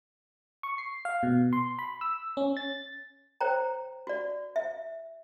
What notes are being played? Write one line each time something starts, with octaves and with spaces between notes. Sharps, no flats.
C#6
C7
F5
B2
C6
B5
E6
C#4
A6
C5 C#5 G5 A#5
F#4 D5
E5